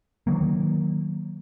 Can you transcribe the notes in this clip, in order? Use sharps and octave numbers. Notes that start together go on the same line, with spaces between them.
D#3 F3 F#3 A#3